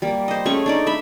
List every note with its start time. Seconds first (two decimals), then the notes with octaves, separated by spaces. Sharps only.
0.02 G3 A#3
0.28 C5 D#5
0.46 A3 C#4 G#4 C#6
0.66 D4 D#4 D5
0.86 A3 E5 B5